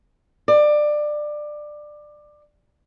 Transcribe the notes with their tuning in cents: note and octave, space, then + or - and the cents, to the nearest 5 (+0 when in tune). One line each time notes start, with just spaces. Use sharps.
D5 +20